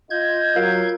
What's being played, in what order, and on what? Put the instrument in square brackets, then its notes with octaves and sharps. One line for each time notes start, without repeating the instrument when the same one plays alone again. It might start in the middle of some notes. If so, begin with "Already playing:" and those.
[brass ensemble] F4 [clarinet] D#5 [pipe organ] G6 G#6
[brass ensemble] F#3 [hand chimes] F4 A#4 [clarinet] F5